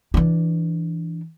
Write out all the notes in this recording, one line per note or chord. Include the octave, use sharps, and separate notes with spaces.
E3 D4